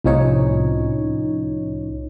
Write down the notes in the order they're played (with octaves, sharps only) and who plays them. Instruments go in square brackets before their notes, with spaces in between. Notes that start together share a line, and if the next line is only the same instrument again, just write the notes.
[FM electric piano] C2 A2 F3 C#4 D#4 C#5